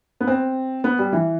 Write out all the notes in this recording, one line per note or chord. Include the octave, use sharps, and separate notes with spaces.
B3
C4
B3
G3
E3